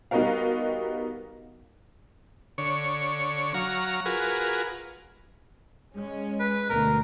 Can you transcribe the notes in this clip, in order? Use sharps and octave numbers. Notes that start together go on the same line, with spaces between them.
G3 B3 D#4 F#4 A#4 F5
D3 C#5 C#6
F#3 F5 A#5 C#6
F4 F#4 G#4 A#4 B4
G#3 C#4
B4
D2 B2 A#4